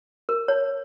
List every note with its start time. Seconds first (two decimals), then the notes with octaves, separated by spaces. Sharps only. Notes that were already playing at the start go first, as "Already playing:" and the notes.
0.29 A#4
0.48 C#5